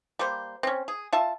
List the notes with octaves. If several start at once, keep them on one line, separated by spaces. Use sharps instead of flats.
G3 A#3 C5
C4 C#4
G#4
F4 E5 A5